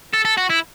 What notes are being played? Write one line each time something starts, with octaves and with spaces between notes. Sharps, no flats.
A4
A4
F#4
E4